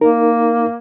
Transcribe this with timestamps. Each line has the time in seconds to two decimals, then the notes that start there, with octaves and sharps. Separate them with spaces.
0.01 A#3 D#4 A#4